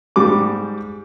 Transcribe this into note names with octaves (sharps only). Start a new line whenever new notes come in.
G#2 G3 D6